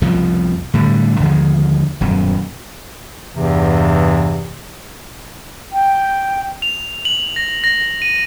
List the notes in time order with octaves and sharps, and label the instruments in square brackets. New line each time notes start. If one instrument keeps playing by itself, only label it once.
[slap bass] C2 F2 B2 F3
A2 D3 G3
D#2 D3 F3 G#3
D#1 F#2 B2
[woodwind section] E2 G2 C3 E3
[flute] G5
[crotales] F7
F#7
A#6
A#6
D#7